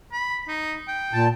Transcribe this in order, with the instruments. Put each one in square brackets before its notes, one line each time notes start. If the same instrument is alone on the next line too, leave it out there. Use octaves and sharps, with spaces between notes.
[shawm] B5
D#4
G5
[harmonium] A#2 A5